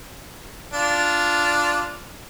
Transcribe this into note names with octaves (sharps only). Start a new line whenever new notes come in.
D4 F4